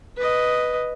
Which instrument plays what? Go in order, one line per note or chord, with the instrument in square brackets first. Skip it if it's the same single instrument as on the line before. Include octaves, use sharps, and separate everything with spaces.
[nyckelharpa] B4 D#5